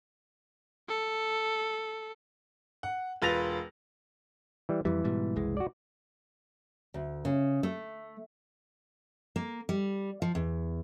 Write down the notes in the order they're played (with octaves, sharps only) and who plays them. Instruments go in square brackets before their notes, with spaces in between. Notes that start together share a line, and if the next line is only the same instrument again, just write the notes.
[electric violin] A4
[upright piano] F#5
E1 F4 B4 A6 A#6 F7
[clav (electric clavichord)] E3 G3
[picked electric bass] F2 G3 [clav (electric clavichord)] E3
[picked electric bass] G#2 B2 G3
F#1 C2 G#3
[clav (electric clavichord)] F#4 D5
[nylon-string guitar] D2
C#3
A3
[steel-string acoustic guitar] A#3
G3
F3
E2